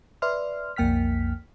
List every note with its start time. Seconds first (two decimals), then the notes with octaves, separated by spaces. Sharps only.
0.22 B4 D5 E5 C6 F6
0.76 B1 F2 A#3 G5 F6 B6